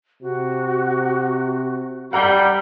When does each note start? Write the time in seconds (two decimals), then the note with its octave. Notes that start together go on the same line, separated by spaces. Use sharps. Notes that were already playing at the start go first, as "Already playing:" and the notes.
0.22 C3 F#4
2.13 G3 F#5 A#5 G6